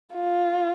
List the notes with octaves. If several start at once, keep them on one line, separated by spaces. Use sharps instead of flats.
F4